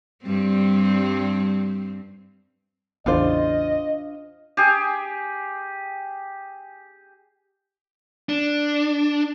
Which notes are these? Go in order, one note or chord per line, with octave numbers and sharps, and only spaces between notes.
G2 G3 C4
A1 E2 C#3 D4 F4 C5 D#5
G4 G#4
D4